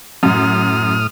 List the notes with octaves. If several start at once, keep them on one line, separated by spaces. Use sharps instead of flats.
F#2 A2 D#6 F6